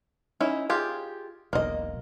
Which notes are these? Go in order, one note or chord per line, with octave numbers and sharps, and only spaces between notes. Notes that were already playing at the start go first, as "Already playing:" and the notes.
C#4 D#4 E4
F4 G4 G#4
E1 B1 A#3 D#5